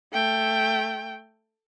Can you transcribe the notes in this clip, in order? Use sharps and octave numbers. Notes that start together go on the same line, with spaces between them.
A3 G5